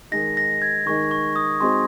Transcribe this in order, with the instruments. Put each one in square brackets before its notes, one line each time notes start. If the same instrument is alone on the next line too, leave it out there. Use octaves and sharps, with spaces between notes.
[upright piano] D#3 G#3 D#4 [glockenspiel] A#6
[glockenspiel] A#6
G#6
[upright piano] D#3 G#3 D#4 [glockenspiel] C#6
[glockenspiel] C#6
D#6
[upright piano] G#3 C4 D#4 F#4 [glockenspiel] C6